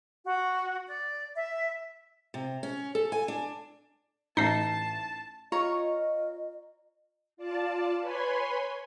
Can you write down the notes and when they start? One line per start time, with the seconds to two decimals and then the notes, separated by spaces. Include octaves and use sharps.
0.24 F#4
0.86 D5
1.36 E5
2.34 C3
2.63 C#4
2.95 A4
3.12 G#5
3.28 D4
4.37 A1 D#4 A5 C7
5.52 F4 C#5 D#5 A#5 C#6
7.37 F4 D5 A5
8.00 B4 C#5 G#5 B5 C6